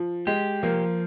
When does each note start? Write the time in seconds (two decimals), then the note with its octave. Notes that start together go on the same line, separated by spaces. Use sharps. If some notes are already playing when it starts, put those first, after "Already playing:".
Already playing: F3
0.27 G#3 G4
0.63 F3 A#3